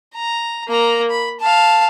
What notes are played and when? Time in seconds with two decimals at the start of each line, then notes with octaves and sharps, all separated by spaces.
0.16 A#5
0.68 A#3 A#5
1.10 B5
1.40 F5 A5